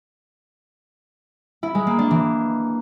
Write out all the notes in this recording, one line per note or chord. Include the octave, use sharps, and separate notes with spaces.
E4
G#3
A#3
D4
E3